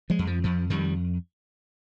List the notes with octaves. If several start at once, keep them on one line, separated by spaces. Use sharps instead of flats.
F3 G#3
F2
F3
F2 F3
F2 D#3 G3